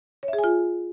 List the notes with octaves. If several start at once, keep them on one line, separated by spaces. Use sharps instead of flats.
C#5
E5
G#4
G#5
F4